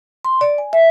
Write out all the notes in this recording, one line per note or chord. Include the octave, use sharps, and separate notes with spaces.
C6
D5
G#5
E5